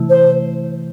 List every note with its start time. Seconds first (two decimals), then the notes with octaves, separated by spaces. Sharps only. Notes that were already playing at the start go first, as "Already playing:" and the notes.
Already playing: C3 E3 A3 E4
0.09 C5